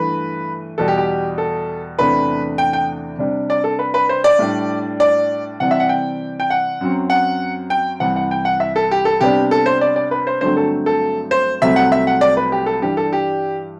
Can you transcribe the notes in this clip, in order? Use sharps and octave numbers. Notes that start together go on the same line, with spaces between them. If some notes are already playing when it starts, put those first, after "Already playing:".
Already playing: G2 E3 A3 B4
E2 B2 G3 A4
G4
G4
A4
E2 C3 E3 A3 D4 B4
G5
G5
C3 G3 D4
D5
A4
B4
B4
C5
D5
A2 G3 D4
D5
C3 E3 G3 C4 F#5
E5
F#5
G5
G5
F#5
F#2 F#3 C4
F#5
G5
C2 C3 E3 F#5
F#5
G5
F#5
E5
A4
G4
A4
C3 G3 B3 D4 G4
A4
C5
D5
D5
B4
C5
G2 D3 F#3 A3 C4 C5
A4
A4
C5
C2 C3 F#3 A3 C4 E5
F#5
E5
F#5
D5
B4
G4
A4
G2 E3 G3 D4 G4
A4
G4